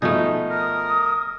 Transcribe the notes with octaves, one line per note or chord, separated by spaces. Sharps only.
B2 F3 A3 D#4 G#4
A#4 D#6